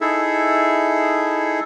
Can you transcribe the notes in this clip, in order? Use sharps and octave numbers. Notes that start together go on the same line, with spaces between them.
D#4 E4 G#4 A4 E5